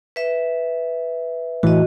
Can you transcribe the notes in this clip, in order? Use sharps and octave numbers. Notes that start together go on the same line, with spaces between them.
B4 E5
A2 E3 F#4 D#5